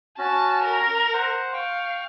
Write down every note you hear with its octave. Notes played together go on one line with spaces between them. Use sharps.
C#4 F#4 A5
A#4
C5 F#5
F5 G5 C#6